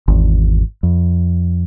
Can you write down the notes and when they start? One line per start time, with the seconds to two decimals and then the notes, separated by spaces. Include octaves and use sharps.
0.08 G#1 E2
0.83 F2